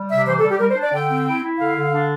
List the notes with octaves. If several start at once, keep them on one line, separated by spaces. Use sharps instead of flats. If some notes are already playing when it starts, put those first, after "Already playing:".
Already playing: G3
C3 E5
E3 C5
A4
G3
G4
G3 A#4
C5
D4
D5
D3 G5
C4
E4
E4
D3 F5
D3
D4